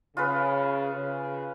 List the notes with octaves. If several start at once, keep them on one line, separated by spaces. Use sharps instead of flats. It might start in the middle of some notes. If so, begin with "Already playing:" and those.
C#3 F4 G#4 B4
C#3